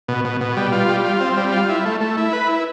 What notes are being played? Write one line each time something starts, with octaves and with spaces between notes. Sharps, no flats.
B2
B2
B2
G3
F4
G3
F4
C4
G3
F4
E4
A3
A3
E4
B4
E4